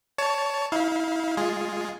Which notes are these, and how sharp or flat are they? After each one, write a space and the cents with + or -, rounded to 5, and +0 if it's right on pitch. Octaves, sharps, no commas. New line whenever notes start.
C#5 +20 A5 +0
E4 -30 F5 +5
G#3 +0 F4 +10 G#4 +0